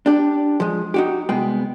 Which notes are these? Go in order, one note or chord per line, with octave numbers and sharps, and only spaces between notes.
D4 G4
F3 G#3
D#4 F#4 G4
C2 G#3 B3 G5